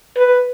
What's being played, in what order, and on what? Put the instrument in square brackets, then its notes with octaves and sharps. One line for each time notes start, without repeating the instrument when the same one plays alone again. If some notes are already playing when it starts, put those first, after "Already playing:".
[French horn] B4